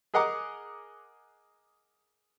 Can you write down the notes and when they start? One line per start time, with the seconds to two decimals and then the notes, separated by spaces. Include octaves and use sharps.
0.14 G#4 A#4 D#5 F#5 A#5 D6